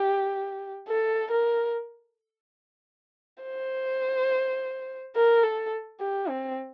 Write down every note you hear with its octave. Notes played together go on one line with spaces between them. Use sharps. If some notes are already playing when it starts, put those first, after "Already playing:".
Already playing: G4
A4
A#4
C5
A#4
A4
G4
C4